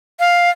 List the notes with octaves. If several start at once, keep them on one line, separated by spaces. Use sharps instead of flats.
F5